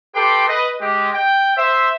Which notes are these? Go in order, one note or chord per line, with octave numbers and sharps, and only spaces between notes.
G4 A4 B4 G5 C6 D6
B4 D#5
G#3 G4
G5
C5 E5